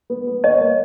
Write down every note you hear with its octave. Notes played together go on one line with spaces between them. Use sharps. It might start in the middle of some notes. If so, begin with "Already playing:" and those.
B3
B3
C#5 D#5
A#3